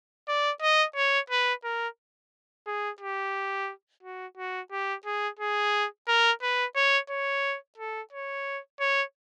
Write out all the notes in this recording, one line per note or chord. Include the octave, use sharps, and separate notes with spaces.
D5
D#5
C#5
B4
A#4
G#4
G4
F#4
F#4
G4
G#4
G#4
A#4
B4
C#5
C#5
A4
C#5
C#5